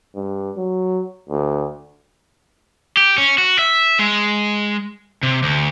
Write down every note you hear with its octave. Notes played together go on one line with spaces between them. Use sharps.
G2
F#3
D2
G4
C#4
F#4
E5
G#3
C3
D2